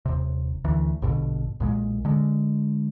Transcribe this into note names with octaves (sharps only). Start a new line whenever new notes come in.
D#1 C3
D2 E3
A#1 G2 B2 D3
B1 A#2 G#3
D3 G#3